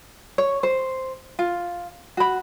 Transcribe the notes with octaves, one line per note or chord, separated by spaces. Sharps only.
C#5
C5
F4
F#4 B5